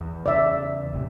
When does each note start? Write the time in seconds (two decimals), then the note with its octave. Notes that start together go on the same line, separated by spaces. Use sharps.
0.01 E2
0.26 E2 C#3 D5 E5
0.93 E1 A1 C3